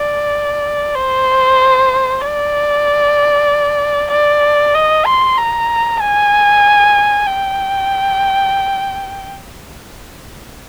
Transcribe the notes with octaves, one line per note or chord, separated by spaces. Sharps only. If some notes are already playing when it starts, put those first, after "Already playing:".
Already playing: D5
C5
D5
D5
D#5
C6
A#5
G#5
G5